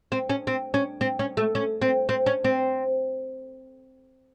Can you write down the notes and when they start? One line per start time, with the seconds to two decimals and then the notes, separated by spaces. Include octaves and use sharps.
0.12 C4
0.30 C#4
0.47 C4
0.74 C#4
1.01 C4
1.19 C#4
1.37 A3
1.55 C#4
1.82 C4
2.09 C4
2.26 C#4
2.44 C4